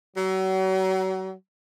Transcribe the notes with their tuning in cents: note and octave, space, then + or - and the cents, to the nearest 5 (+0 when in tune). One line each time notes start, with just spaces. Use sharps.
F#3 +35